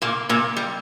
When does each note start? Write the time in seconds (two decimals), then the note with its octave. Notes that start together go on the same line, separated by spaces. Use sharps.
0.02 A#2 A#3
0.29 A#2 A#3
0.57 G3